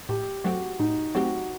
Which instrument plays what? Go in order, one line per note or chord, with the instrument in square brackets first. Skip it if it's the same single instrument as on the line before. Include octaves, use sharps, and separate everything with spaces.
[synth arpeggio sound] A2 [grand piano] G4
[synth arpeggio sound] F#3 A3 C4 G4 [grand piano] F#4
[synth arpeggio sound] A2 [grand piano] D#4
[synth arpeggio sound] F#3 A3 C4 G4 [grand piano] F#4